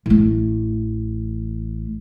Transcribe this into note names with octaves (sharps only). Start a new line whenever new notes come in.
A1 A3